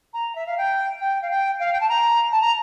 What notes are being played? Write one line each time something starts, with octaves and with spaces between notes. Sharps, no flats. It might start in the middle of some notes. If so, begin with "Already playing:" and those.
A#5
E5
F5
G5
G5
F5
G5
F5
G5
A5
A#5
A5
A#5